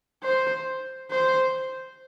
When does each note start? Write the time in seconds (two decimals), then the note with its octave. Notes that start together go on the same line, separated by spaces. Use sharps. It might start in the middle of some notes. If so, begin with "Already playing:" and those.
0.23 C5
1.11 C5